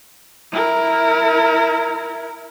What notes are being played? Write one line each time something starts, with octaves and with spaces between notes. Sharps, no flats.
E4 A#4